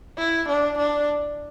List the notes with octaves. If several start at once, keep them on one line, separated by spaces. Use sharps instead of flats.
E4
D4
D4